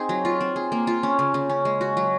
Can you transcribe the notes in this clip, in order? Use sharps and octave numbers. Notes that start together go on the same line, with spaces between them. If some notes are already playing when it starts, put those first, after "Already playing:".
Already playing: C4 D#4 G#4
F#3
F4
C4
G#4
A#3
F4
C#4
C#3
C#3
C#4
G#3
F#4
F#3